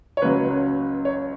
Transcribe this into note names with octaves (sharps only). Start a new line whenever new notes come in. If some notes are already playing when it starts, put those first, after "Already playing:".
C#5
C#2 C#3 F#3 B4
C#5